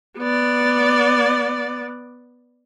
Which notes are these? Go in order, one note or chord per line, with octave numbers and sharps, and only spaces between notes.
B3 D5